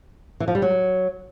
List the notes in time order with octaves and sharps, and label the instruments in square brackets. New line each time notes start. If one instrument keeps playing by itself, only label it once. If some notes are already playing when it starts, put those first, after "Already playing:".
[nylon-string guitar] E3
F3
G3
F#3